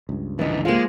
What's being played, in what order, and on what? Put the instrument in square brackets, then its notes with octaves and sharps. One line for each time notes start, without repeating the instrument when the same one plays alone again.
[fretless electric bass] C#2 G2
[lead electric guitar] F2 D3 [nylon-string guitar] E3 D#4
[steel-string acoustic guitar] F3 A#3 [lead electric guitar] G#3 [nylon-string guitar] F4 G4